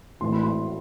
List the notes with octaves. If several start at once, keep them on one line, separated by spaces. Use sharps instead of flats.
A2 E3 C6
B5
C6